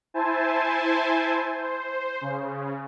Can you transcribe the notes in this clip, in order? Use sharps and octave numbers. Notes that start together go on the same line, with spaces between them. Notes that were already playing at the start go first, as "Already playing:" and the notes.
E4 C5 G#5 A5
C5
C#3